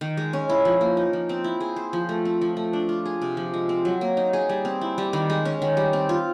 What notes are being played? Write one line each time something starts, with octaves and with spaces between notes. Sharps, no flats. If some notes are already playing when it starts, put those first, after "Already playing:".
D#3
G#3
C#4
E4
F3
A#3
D#4
F3
C4
E4
G#4
C5
F3
A3
C4
F3
A3
D4
F4
G#4
C3
F3
G#3
C4
F#3
A#3
D#4
G#4
G3
C4
E4
G3
D#3
G#3
C#4
D#3
G3
C4
F4